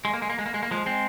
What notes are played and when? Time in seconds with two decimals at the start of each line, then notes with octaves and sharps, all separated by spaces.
0.05 G#3
0.14 A#3
0.22 G#3
0.30 A#3
0.39 G#3
0.46 A#3
0.54 G#3
0.63 A#3
0.71 F3 G#3
0.86 G#3 C4